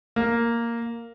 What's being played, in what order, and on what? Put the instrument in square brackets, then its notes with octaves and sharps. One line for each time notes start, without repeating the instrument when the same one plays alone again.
[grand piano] A#3